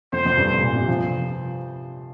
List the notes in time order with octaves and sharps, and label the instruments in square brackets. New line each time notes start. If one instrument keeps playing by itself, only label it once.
[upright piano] F2 [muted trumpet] C5
[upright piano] F2
G2
G2
A#2
C3
F3